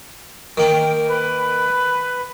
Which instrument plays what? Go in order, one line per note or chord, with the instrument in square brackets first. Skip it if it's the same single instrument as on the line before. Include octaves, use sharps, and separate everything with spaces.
[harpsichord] D#3 A#3 [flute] G5
[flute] B4